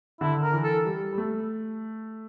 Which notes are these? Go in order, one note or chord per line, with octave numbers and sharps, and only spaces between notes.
D3 E4
A#4
E3
A4
G3
G3
A3